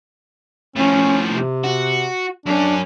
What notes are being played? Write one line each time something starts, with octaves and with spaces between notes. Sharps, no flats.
A2 F3 C#4
C3
F#4
F#2 C#4 D4